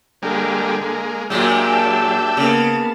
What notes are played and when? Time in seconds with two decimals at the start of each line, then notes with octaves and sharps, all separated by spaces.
0.22 D3 G3 G#3 A#3
0.82 G#3 A#3
1.30 A#2 F#3 G#3 A#3 D4 G4 E5
1.72 A5
2.37 C#3 A#3 B3